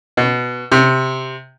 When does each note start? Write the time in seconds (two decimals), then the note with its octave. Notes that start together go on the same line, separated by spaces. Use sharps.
0.17 B2
0.72 C3